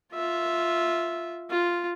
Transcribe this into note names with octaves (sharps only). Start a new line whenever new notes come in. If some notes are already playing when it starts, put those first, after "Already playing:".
F4 E5
F4